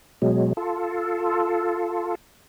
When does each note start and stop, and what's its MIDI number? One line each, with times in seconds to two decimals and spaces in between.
0.22 0.53 47
0.22 0.53 54
0.22 0.53 56
0.57 2.15 65
0.57 2.15 69